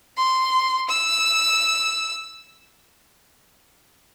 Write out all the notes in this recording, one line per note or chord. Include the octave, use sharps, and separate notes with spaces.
C6
E6